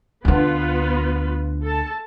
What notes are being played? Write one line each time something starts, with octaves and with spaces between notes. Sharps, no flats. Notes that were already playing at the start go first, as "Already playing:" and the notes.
D2 D3 B3 F4 B4
A4 A5